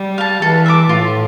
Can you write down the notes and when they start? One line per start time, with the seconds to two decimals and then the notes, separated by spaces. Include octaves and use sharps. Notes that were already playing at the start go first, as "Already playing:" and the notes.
Already playing: G3
0.18 F5 A5
0.42 E3 A4
0.66 E5 A#5 D6
0.89 A2 F4